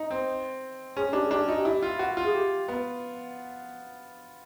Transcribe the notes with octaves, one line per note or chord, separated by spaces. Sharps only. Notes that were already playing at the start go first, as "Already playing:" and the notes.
Already playing: D#4
C4
C#4 G#4
D4 G4
G#4
D4 G4
D#4 F#4
G4
E4
F4
F#4
F4
G#4
G4
B3